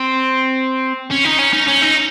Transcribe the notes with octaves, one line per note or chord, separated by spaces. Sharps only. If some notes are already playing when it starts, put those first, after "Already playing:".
Already playing: C4
C#4
D#4
C#4
D#4
C#4
D#4